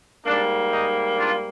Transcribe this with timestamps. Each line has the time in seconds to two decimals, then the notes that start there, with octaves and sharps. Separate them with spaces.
0.25 G#2 G3 A#3 D4
0.71 D#4
1.17 D4 F4